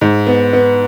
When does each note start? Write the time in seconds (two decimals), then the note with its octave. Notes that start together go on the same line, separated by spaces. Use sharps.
0.01 G#2
0.27 B3
0.53 B3